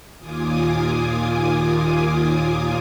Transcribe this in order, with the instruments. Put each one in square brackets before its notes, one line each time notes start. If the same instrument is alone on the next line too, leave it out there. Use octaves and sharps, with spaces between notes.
[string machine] D#2 A#2 F4 G#5 D6 D#6